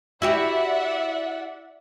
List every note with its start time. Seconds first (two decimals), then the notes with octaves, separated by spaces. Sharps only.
0.22 E4 F#4 G4 D5 E5 F#5